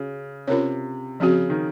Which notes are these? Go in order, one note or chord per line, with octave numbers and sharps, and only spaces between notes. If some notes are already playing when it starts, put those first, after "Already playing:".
Already playing: C#3 C#4 F#4
C3 C#4 F4 A#4 C#5
C#3 F3 C4 F#4
D#3